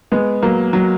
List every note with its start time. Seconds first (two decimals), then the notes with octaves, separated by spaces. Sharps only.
0.12 G#3 B3
0.42 F#3 A#3
0.73 F#3